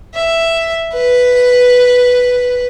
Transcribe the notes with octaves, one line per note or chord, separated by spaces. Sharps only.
E5
B4